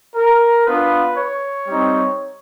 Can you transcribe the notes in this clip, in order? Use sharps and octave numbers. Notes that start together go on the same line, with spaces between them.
A#4
B3 D4 F4 B4
C#5
G3 C4 D#4